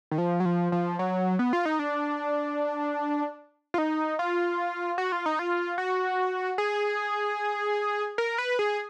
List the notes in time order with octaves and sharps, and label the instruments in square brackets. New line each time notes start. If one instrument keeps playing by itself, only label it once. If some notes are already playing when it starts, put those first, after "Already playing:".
[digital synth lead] D#3
F3
F#3
F3
F3
F#3
B3
F4
D#4
D4
F4
D#4
F4
F#4
F4
D#4
F4
F#4
G#4
A#4
B4
G#4